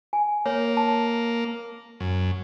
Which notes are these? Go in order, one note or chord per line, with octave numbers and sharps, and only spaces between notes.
G#5
A#3 C#5
A5
F#2